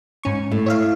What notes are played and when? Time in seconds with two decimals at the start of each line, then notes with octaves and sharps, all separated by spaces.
0.23 G#2 C#4 C#6
0.51 A2
0.66 C#5 E5 F5